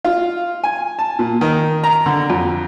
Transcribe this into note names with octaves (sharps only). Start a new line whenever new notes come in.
F4
G#5
A5
A#2
D#3
A#5
D3
F2